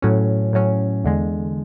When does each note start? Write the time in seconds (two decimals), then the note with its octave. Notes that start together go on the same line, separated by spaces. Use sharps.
0.02 A2 F#3 C#4
0.53 A2 F#3 C#4
1.04 E2 D3 G#3